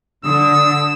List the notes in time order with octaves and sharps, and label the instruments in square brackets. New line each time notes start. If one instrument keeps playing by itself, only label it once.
[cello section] D3 [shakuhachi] D#6 [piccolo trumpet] E6